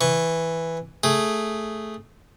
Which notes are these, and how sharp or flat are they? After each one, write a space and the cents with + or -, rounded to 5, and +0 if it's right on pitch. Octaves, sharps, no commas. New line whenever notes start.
E3 +0 C#6 +0
A3 +0 G#4 +0